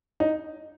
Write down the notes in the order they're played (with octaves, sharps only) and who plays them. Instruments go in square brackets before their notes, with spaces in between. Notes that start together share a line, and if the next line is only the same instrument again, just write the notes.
[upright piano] D#4